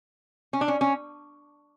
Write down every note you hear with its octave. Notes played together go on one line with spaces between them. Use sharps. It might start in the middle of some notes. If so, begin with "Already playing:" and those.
C#4
D4
C#4
C#4